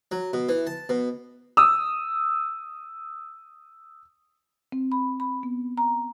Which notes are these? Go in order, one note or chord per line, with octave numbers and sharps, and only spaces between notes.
F#3
B2
E3
A5
B2
D#6 E6
C4
B5
B5
B3
A#5